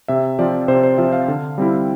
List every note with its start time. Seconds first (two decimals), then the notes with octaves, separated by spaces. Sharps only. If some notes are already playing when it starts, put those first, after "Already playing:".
0.08 C3 E5
0.39 F3 C4 F4 D5
0.68 C3 C5
0.83 C5
0.98 F3 C4 F4 E5
1.12 F5
1.28 D3
1.58 G3 C4 E4